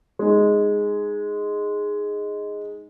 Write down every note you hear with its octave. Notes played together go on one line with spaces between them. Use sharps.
G#3 D#4